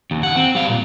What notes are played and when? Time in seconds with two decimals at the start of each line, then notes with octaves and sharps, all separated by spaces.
0.11 D#2
0.23 E2 F#5
0.36 C4
0.55 G3 F5
0.69 A#2